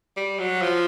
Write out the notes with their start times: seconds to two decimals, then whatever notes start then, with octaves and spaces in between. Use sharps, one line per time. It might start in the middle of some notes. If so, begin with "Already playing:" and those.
0.17 G3
0.39 F#3
0.62 F3